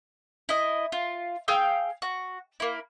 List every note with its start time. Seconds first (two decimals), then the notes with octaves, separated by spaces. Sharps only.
0.49 E4 D#5
0.92 F4
1.48 G#4 F5 G5 E6
2.02 F#4
2.60 A#3 E4